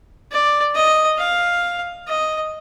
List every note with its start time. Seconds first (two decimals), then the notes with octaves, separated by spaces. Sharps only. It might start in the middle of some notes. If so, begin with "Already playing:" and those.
0.32 D5
0.76 D#5
1.19 F5
2.07 D#5